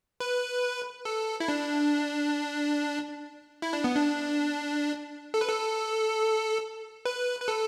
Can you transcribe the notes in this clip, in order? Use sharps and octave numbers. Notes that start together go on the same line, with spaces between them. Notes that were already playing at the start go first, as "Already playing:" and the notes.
B4
A4
E4
D4
E4
D4
B3
D4
A4
B4
A4
B4
B4
A4